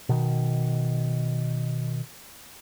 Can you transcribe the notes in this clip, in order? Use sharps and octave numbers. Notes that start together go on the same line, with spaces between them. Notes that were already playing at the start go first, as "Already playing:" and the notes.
B2 D#3